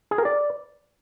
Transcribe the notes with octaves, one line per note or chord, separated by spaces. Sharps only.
G#4
A#4
D5